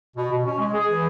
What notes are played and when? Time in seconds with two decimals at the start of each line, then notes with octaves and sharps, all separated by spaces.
0.17 B2
0.31 B2
0.45 C#4
0.59 G#3
0.74 G#4
0.89 E3